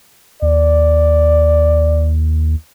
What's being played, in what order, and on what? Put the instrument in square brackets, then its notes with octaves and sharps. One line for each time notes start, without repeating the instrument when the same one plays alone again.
[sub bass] D#2 [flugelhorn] D5